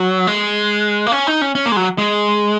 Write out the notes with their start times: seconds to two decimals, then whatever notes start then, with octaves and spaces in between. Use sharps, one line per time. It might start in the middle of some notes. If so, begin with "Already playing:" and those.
Already playing: F#3
0.27 G#3
1.06 A#3
1.12 C#4
1.27 D#4
1.41 C#4
1.55 C#4
1.66 A#3
1.72 G#3
1.76 F#3
1.98 G#3